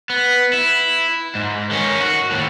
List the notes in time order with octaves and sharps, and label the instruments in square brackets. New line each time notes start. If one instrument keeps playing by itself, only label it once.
[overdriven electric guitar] B3
E4
G#2
D#3 C#4
F#4
D#2 A2